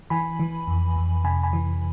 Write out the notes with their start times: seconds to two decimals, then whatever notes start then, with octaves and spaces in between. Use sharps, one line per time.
0.10 E3 G#5 B5
0.40 E3
0.68 F2
0.96 F2
1.24 C3 G#5 B5
1.43 G#5 B5
1.53 E3